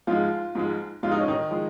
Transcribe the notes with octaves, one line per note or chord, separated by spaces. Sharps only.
G#2 F3 G#3 F4
G#2 F3 G#3
G#2 F3 G#3 F4
D#4
C#4
D#3 D#4
F3 G#3